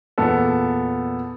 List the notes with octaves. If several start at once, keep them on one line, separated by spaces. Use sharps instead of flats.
E2 A#2 B3 A4